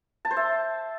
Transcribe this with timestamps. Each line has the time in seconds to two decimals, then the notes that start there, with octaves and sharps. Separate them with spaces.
0.25 A5
0.31 C5
0.37 E5